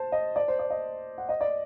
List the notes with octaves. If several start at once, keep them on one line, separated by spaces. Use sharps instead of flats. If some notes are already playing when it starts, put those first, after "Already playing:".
Already playing: C5 A5
D#5
D5
C5
D5
D#5
F#5
D#5
D5